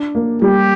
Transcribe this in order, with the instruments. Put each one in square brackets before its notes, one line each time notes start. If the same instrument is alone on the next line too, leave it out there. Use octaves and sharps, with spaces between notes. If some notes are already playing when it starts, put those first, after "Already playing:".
Already playing: [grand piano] D4
A#3
[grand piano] G3 [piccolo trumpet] G4